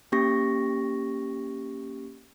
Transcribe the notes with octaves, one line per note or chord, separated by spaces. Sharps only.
A#3 C#4 G4 C#6 A#6